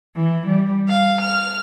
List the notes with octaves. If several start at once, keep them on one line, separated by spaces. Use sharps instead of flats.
E3
G3
F5
F6